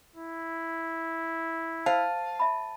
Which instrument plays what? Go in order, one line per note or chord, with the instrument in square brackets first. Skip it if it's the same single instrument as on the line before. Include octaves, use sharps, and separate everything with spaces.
[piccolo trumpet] E4
[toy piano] C5 [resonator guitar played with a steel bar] F5 [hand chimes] A5
[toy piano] E5 B5